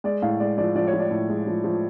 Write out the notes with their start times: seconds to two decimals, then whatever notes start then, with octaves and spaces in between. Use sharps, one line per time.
0.04 G#3 D5
0.22 A2 F5
0.40 G#3 D5
0.58 F3 D5
0.76 F3 D5
0.87 C#5
0.93 F3
1.00 D5
1.11 A2
1.29 G#3
1.47 F3
1.64 F3